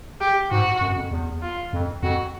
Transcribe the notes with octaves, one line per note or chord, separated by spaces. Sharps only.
G4
G#2 F#4
F#2
F2
E2
F4
F2
F2 F#4